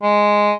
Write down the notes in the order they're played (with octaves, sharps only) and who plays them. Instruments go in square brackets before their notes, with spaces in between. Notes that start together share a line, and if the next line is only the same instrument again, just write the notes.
[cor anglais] G#3